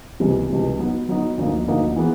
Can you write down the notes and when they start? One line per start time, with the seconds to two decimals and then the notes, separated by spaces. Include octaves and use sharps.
0.20 C#2 C3 E3 G3
0.50 C#2 C3 E3 G3
0.79 F#3 B3 D#4
1.09 F#3 B3 D#4
1.38 D2 D3 F3 A#3 D#4
1.68 D2 D3 F3 A#3 D#4
1.96 E3 G#3 B3